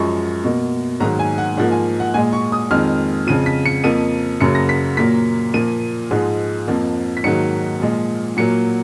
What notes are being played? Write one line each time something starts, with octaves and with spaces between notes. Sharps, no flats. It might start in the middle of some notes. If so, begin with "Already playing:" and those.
Already playing: F#2 F3 G#3 C#6
B2 A#3
G#2 D#3 F#3 A#3 A#5
G#5
F#5
G#2 F3 A#3 F#5
G#5
F#5
A#2 G#3 G#5
C#6
D#6
F2 D#3 G#3 F6
F2 C#3 F3 D#7
B6
C#7
F2 F3 A#3 D#7
F#2 C#3 F#3 A#3 C#7
A#6
B6
A#2 F#3 A#3 B6
A#2 F3 A#3 D#7
G#2 F3 G#3
F2 F3 A#3
B6
G#2 D#3 F#3 A#3 C#7
A#2 F3 G#3
A#2 F#3 A#3 C#7